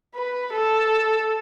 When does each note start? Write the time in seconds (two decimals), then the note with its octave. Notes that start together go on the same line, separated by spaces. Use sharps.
0.15 B4
0.53 A4